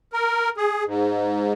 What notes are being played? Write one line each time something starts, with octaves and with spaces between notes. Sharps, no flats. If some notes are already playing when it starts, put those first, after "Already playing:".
A#4
G#4
G#2